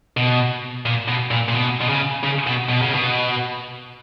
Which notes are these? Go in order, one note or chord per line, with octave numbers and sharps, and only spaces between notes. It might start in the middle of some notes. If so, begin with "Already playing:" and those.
B2
A#2
B2
A#2
A#2
B2
B2
C#3
C#3
B2
B2
C#3
B2